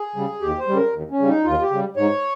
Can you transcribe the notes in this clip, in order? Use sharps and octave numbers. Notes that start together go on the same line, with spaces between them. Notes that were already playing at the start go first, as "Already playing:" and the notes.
Already playing: G#4
C#3 G3
D#2 G4
C5
C#3 G3
A#4
D#2
C#4
C#3 G3
D#4
D#2 F4
G4
C#3 G3
G#2 C#5